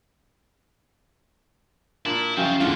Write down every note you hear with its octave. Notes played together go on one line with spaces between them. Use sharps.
A#2 D4 E4 A#4
C2 F#2 C#3 F3 G5
E1 E2 A#2 D3 F4